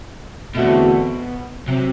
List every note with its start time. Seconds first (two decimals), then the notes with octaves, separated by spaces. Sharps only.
0.55 E2 B2 D3 A3 C4 F#4
1.67 C3 F#3 C4